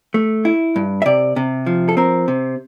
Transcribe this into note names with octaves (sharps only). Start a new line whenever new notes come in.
A3
E4
G2
E5
C3 D5
C3
F3
A4
C4 A#4
C3